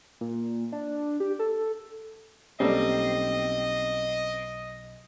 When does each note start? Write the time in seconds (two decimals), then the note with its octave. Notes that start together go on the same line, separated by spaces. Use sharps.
0.21 A#2
0.72 D4
1.20 G4
1.39 A4
2.60 B1 G3 A#3 C4 C#4 A4 D#5